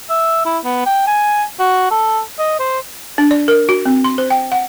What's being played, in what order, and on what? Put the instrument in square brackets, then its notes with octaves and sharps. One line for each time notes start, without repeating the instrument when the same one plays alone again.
[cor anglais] E5
E4
B3
G5
G#5
F#4
A4
D#5
C5
[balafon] D4
D5
A#4
F#4
C4
C6
C5
G5
F#5